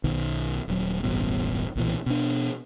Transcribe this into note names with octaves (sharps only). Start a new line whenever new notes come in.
B1 D#3
D#1 F#3
E1 A1 G2 B2
B1 A#2 E3
B2 D4